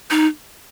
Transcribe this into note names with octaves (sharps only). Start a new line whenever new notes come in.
D#4